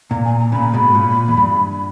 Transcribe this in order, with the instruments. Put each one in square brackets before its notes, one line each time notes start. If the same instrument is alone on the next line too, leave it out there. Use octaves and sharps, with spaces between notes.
[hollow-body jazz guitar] A#2 [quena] A#5
[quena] G#5
A#5
[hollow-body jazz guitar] A#2 C#3 [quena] B5
[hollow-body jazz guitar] G#2 B2
A#2
E2
G2